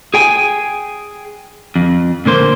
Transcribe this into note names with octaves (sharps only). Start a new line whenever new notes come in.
G#4 G5 G#5
F2
A#2 D3 A#3 C5